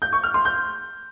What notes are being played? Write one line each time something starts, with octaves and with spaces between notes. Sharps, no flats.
G6
C#6
F6
C6
G6